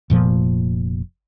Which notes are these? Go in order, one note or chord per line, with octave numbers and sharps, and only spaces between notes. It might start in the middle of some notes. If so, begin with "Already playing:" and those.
F1 A#2 F3